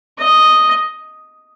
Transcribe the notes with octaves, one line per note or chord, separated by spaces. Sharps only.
D#5